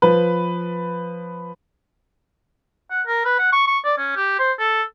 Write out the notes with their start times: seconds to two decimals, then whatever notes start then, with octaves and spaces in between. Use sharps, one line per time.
0.02 F3 B4
2.91 F#5
3.07 A#4
3.25 B4
3.39 F#5
3.52 C#6
3.67 C#6
3.84 D5
3.98 C#4
4.16 G4
4.39 C5
4.59 A4